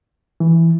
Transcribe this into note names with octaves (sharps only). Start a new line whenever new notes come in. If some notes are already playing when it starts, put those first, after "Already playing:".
E3